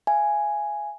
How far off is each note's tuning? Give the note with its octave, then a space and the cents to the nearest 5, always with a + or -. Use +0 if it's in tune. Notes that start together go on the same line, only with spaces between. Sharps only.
F5 -40 G#5 +0